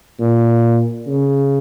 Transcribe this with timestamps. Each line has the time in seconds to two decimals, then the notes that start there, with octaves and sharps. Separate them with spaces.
0.20 A#2
1.07 C#3